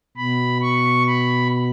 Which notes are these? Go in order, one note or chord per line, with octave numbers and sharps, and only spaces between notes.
B2 B5
C#6
B5